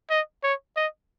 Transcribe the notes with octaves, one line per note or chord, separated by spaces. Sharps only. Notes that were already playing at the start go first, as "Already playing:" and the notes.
D#5
C#5
D#5